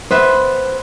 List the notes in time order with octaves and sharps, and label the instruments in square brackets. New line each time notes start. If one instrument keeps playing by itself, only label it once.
[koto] B3 B4 E5 [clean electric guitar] C5